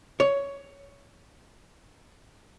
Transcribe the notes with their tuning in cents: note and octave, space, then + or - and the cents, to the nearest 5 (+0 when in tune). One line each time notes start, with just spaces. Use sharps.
C#5 +10